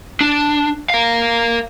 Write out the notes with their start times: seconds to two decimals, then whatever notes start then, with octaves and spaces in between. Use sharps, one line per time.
0.21 D4
0.90 A#4 F5